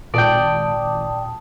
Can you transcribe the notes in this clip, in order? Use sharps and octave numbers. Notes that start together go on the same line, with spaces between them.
G#1 A#2 D5 G5 A5 D#6